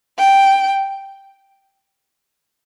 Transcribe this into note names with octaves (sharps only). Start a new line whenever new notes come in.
G5